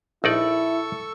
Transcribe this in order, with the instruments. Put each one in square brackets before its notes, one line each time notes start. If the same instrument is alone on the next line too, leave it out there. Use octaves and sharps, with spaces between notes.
[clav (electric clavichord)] A#1 D#4 D5 [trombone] E4 [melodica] A4 C#6 E6